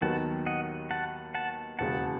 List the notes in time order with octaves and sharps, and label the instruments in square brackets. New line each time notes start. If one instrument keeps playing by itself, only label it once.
[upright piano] D#2 D#3 F#3 B3 [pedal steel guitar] F#5 A5
[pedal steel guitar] D#5 F#5
F#5 A5
F#5 A5
[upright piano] E1 D#2 C#3 [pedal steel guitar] F#5 A5